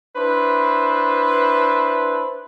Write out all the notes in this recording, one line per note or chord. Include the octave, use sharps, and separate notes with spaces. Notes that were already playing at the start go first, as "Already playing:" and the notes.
D4 E4 B4 C5